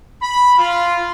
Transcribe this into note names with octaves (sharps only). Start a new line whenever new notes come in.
B5
F4